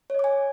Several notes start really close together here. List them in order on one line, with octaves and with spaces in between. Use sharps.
C#5 D#5 D6 G#5